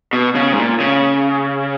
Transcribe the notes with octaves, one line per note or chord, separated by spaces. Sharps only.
B2
C#3
G#2
A#2
C#3